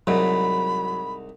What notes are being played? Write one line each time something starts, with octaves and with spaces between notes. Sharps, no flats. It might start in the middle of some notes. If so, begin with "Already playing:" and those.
C2 G#2 F#3 B5